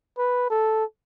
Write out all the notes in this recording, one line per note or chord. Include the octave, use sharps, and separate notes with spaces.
B4
A4